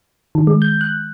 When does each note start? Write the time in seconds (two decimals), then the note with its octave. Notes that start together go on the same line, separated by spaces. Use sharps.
0.35 D#3
0.47 G#3
0.62 G6
0.81 F#6